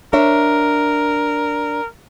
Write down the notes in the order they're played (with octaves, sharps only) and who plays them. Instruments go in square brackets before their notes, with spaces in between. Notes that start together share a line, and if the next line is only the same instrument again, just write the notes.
[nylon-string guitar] D4 C#5 E5 [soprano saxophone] A#4